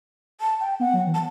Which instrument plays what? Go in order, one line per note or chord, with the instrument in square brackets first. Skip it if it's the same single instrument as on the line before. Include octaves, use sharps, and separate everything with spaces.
[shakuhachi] A5
G5
[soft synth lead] B3 [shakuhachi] F#5
[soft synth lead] F#3
E3
[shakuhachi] A5